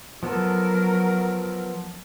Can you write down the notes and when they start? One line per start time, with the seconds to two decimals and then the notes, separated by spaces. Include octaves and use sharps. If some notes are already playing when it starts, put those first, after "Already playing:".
0.23 F3 F#3 B3 A4 A#4